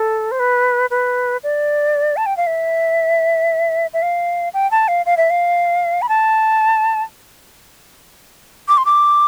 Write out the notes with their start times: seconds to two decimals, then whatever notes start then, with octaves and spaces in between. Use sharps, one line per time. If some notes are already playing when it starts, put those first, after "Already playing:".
Already playing: A4
0.32 C5
0.40 B4
0.91 B4
1.44 D5
2.17 A5
2.26 G5
2.37 F5
2.47 E5
3.93 E5
4.02 F5
4.54 G5
4.71 A5
4.88 F5
5.06 F5
5.17 E5
5.30 F5
6.02 B5
6.09 A5
8.68 D6
8.77 C6
8.85 D6